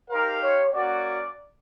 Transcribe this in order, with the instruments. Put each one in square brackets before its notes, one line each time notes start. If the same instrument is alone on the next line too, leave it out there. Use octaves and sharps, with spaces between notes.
[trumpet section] D#4 G4 C5 F5 [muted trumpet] A#4
[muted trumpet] C#5
[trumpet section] A#3 C#4 F#4 [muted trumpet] D5